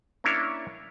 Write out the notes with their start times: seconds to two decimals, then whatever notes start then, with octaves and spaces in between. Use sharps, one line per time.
0.24 A#3 C#4 D4 E4 C#5